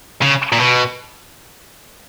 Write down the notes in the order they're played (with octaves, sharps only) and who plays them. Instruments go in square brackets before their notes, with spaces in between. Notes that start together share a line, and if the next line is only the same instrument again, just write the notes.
[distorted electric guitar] C#3
A#2
B2